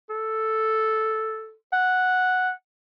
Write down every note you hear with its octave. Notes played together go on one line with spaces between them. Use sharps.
A4
F#5